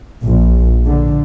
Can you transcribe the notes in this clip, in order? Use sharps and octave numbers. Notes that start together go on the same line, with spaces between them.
A#1
D3